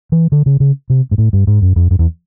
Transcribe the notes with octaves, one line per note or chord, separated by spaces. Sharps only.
E3
D3
C#3
C#3
C3
G#2
A2
G2
G#2
F#2
F2
F#2
E2